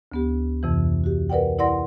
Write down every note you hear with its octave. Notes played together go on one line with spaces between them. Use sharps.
D2 B3 G4
F2 C3 E3
F#4 G4
A#4 B4 D5 F#5 G5
E4 D5 F#5 C6 A#6